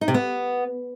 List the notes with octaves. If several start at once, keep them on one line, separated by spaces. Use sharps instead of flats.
D#4
C3
B3